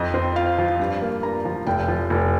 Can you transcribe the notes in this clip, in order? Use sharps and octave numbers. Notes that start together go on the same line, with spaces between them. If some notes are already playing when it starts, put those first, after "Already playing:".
Already playing: F2 D#5
C4
F4 F5
F3
G2
A#3
G2 A#5
F3
F1 G5
F3
F1